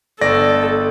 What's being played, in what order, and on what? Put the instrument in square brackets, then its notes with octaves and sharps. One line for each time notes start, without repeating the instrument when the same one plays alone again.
[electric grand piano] G1 D5 A#6 [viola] A4